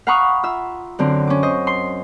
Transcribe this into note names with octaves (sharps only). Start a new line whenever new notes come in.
F5 F#5 A#5 B5 C#6 D#6
F4 E5 E6
F#2 D3 C4 C6
C#4 D6
C5 D#5
C6